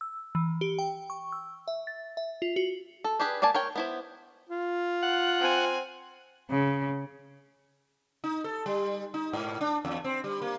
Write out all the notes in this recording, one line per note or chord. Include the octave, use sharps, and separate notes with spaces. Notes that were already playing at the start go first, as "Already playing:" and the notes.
E6
E3
G4
G5
C#6
E6
E5
A6
E5
F4
F#4
A4
D4 G4 G#4 B4
A#3 D5 G#5 A5
A#4 C#5 G5
B3 E4 C5
F4
F#5
C4 G#5
C#3
D#4
A4
G3
D#4
G#2
D4
E2
C4
G3
A#3